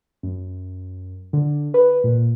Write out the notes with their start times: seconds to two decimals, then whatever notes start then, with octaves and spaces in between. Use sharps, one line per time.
0.23 F#2
1.33 D3
1.74 B4
2.04 A#2